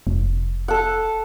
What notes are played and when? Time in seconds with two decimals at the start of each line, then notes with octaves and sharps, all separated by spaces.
0.07 F1
0.68 A4 F#5